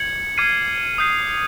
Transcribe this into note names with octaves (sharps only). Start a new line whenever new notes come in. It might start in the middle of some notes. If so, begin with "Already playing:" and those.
Already playing: G#6 C#7 F#7
D6 F6 G#6 C7 D#7
D#6 G6 C7